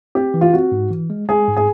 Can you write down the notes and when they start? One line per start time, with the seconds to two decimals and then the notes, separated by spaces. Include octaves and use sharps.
0.15 C4 G4
0.34 E3
0.41 F4
0.53 C4 F#4
0.72 G#2
0.91 E3
1.10 G#3
1.28 G#3 G#4
1.47 G#2
1.57 G#4